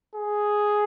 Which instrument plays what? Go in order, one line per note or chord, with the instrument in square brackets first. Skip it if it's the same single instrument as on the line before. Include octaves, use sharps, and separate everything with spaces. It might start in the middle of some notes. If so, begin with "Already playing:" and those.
[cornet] G#4